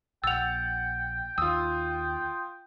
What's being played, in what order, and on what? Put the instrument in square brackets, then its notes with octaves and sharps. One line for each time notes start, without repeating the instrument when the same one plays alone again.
[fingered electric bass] A#1 [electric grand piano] F#5 A6 [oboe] G5 [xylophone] E6 F7
[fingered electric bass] D#2 [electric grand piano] F4 D#6 [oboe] G5 [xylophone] E6